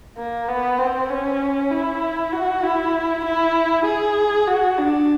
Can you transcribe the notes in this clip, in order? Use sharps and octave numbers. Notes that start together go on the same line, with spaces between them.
A#3
B3
C4
C#4
E4
F#4
E4
E4
G#4
F#4
D4